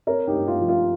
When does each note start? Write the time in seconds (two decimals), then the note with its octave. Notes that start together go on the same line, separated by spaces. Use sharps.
0.07 C4 A#4 C#5
0.27 D#4 G4
0.34 G2
0.48 F4
0.61 F3
0.69 F4